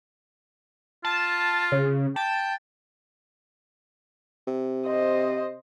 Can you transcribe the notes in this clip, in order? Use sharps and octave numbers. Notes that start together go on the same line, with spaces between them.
F4 A5
C#3
G5 A5
C3
C5 D#5